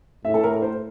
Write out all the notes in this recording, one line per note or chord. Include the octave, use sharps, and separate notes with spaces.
A2 E5
A4
A#4
C5